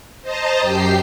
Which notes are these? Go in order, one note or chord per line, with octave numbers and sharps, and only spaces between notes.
C5 D#5 A5 A#5
F#2 G4 G5 C7